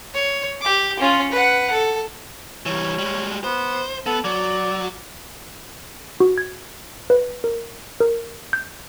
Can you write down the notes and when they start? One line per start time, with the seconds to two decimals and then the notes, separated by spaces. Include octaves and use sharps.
0.14 C#5
0.61 G4 D6
1.00 C#4 F4
1.31 B4 F#5
1.72 A4
2.66 E3 G3 C#5
2.98 G3 G#3
3.44 B3 C5
4.06 B3 A4
4.25 F#3 D5
6.20 F#4
6.38 G#6
7.10 B4
7.44 A#4
8.00 A#4
8.53 G6